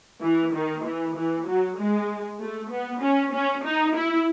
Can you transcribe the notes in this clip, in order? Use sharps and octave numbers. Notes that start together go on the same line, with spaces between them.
E3
D#3
E3
E3
F#3
G#3
A3
B3
C#4
C#4
D#4
E4